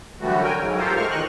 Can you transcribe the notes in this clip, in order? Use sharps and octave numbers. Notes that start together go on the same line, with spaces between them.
F#2 D3 E3 G3 A3 F#4
A#4 G5 G#5
G#2 F#3
F4 G4 A4 A#4 C5
G#3 A3 C5 C#6 F6
E2 D#3 D#5 C#6 F#6